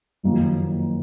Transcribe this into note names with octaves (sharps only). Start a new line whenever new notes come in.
F#1 F2 D#3 F#3 A#3